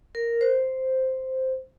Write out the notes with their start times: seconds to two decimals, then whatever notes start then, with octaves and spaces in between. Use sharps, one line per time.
0.15 A#4
0.41 C5